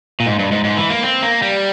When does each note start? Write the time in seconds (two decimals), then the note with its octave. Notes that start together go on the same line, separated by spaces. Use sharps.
0.20 A#2
0.26 G#2
0.39 G2
0.51 G#2
0.64 G#2
0.77 E3
0.90 A#3
1.03 C4
1.22 A#3
1.42 G3